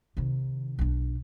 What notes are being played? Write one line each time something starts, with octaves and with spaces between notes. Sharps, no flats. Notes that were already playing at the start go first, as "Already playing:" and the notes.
C3 D#3
B1 D4